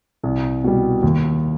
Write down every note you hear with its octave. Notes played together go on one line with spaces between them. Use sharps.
C2
B2 G3
D#2